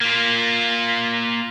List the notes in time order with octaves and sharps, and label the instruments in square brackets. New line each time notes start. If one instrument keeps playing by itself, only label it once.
[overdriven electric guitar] A#3 F4